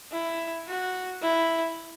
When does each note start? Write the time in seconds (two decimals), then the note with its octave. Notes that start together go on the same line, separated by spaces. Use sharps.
0.12 E4
0.67 F#4
1.22 E4